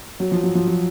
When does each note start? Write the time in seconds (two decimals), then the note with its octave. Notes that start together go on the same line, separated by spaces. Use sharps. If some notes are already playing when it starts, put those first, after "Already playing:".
0.20 F#3
0.32 F3
0.43 F#3
0.55 F3
0.67 F#3